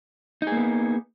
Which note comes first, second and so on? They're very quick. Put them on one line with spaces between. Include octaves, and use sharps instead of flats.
D#4 G#4 A#3 B3